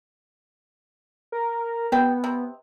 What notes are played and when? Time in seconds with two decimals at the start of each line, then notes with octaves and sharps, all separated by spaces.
1.32 A#4
1.92 B3 G4 B4 G5
2.24 C3